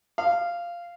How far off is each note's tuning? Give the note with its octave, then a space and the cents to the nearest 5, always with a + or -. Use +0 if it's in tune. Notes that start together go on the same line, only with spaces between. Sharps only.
F5 -10